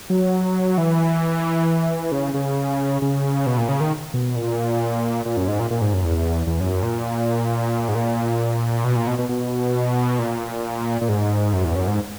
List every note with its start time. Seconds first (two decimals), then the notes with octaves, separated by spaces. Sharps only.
0.10 F#3
0.78 E3
2.12 C#3
2.34 C#3
3.02 C#3
3.46 B2
3.58 A#2
3.69 C#3
3.80 D#3
4.14 B2
4.36 A#2
5.25 A#2
5.37 F#2
5.48 G#2
5.60 A#2
5.71 A#2
5.82 G#2
5.93 F#2
6.04 E2
6.47 E2
6.60 F#2
6.83 A#2
7.88 G#2
7.95 A#2
8.84 B2
8.96 A#2
9.07 B2
9.19 B2
9.29 B2
10.19 A#2
11.01 A#2
11.09 G#2
11.53 F#2
11.64 E2
11.76 F#2
11.88 G#2